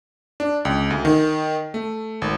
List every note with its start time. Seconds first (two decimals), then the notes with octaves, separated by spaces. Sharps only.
0.40 D4
0.65 C#2
0.90 D2
1.05 D#3
1.74 A3
2.22 G#1